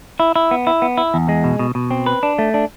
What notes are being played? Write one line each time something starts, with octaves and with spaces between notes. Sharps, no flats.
E4
E4
B3
E4
B3
E4
E2
G#3
B2
B2
B2
C4
B4
D4
A3
D4